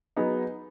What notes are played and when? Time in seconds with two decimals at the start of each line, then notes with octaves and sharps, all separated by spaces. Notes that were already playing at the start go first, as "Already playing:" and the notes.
0.17 F#3 B3 D#4 G#4